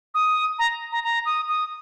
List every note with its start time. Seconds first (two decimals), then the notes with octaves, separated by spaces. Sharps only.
0.14 D#6
0.59 A#5
0.92 A#5
1.04 A#5
1.26 D#6
1.49 D#6